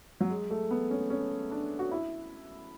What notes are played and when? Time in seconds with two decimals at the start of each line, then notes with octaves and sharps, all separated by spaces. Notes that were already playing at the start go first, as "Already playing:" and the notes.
0.21 F#3
0.30 G#3
0.51 A3
0.71 B3
0.91 C#4
1.10 C#4
1.51 D4
1.79 F#4
1.91 E4